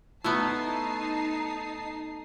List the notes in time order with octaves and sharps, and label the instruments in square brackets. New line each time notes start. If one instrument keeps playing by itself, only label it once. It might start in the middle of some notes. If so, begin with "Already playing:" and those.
[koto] A3 B3 [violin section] D#4 A5 C7 [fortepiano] E4 B5